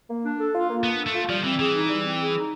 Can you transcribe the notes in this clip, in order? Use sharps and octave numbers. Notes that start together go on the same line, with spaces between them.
A#3
D4
A4
F4
A#3
B3 D4
A4
A3
F4
F3 G3
E3 C4
E3 G#4
D#4
G3
C4
G#4
D#4